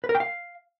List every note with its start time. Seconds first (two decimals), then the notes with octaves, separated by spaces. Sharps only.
0.04 B4
0.09 A#4
0.15 G5
0.20 F5